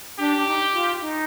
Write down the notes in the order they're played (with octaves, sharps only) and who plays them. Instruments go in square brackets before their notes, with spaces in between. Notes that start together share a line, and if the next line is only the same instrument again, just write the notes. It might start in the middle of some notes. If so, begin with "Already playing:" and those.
[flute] D4 [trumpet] G4
[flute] D4
D#4
F4
D#4